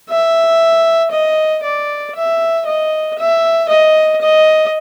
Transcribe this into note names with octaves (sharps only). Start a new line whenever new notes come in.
E5
D#5
D5
E5
D#5
E5
D#5
D#5